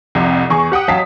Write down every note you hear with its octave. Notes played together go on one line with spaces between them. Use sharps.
C2 F2 C3
E2 G#4 C#6
G4 F#5 G5 D#6
A1 F#3 F5 G5 A5 B6